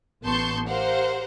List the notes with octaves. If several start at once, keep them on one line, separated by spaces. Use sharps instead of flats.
A1 B3 A5 C6 C#6 G6
G4 A#4 C5 F5 F#5